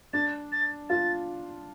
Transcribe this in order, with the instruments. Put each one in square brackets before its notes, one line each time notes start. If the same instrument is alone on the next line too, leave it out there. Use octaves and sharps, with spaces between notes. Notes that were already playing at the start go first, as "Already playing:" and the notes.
[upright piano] D4 [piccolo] A6
[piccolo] A6
[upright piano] F4 [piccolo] A6